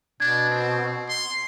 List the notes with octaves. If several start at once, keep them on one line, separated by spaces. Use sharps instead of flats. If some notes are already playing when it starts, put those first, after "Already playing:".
B2 D4 G#6
C4
C6